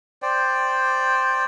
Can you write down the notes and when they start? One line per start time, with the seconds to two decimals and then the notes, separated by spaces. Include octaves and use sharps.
0.22 C5 D5 G5